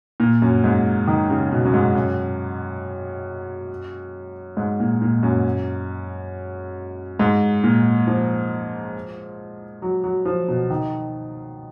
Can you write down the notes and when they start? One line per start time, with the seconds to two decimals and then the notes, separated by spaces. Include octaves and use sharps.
0.20 A#2
0.42 F#2
0.64 G#2
1.07 D#3
1.30 C#3
1.52 B2
1.65 F#2
1.74 G#2
1.95 F#2
4.57 G#2
4.80 A#2
5.01 A#2
5.23 F#2
7.19 G#2
7.64 A#2
8.07 F3
9.82 F#3
10.04 F#3
10.25 F3
10.48 B2
10.70 D#3